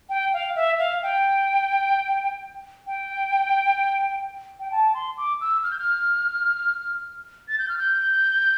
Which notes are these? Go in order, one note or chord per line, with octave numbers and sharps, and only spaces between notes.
G5
F5
E5
F5
G5
G5
G5
A5
C6
D6
E6
F6
G6
F6
A6
G6
F6
G6